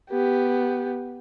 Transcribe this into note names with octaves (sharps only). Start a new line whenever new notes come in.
B3 G4